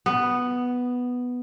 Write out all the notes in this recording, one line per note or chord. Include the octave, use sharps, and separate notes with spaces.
B3